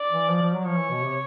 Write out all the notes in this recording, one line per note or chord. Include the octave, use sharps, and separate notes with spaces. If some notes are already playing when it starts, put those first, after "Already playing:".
Already playing: D5
E3
F3
F3
F#3
F3 C#5
E3
B2
C3